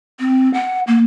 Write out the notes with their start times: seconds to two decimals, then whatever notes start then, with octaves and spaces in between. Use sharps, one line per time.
0.20 C4
0.54 F#5
0.87 A#3